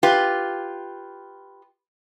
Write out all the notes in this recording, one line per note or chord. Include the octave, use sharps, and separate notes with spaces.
F4 G4 B4